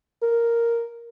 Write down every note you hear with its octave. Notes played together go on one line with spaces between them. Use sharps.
A#4